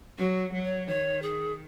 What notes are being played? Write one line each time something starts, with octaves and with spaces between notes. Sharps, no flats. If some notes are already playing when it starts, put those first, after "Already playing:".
F#3 F#4
F#3
C#5
D#3 C#5
G#4